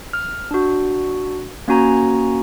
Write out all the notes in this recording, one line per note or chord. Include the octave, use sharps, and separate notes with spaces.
F6
D4 F#4
A#3 C#4 F#4 G#5 A#5